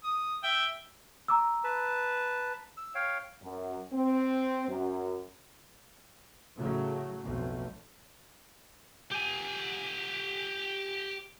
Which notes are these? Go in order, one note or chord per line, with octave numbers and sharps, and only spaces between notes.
D#6
E5 G5
A#5 D6 E6
B4 A5
E6
C#5 F5 G5
F#2
C4
F#2
A2 C#3 F#3 A3
B1 F2 A3
G4 G#5